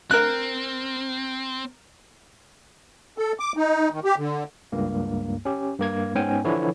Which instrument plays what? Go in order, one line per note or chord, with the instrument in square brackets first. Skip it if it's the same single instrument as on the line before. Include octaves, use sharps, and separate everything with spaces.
[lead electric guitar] C4 [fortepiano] A#4 F#6
[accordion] A4
D6
D#4
D#3
G4
D3
[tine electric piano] C#2 G2 A#3
C#4 G4
G2 A#3 G#6
G#2 B3 C#4 G5 G#5
D3 E3 F3 E4 C#5